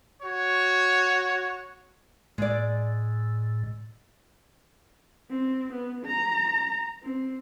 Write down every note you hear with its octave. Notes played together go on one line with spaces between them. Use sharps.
F#4 C#5
A2 G#3 D5
C4
B3
A#5
C4